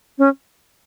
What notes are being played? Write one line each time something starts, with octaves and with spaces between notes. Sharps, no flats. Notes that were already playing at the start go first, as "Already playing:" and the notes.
C#4